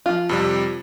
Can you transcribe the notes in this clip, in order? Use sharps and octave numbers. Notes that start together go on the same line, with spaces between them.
F3 F4
F2 C3 G3